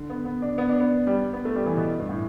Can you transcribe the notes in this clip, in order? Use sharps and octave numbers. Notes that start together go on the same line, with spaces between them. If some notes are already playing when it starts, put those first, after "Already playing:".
Already playing: D3
B3
B3
D4
B3
D4
B3
G3
B3
A3
G3
E3
B2
G2
A2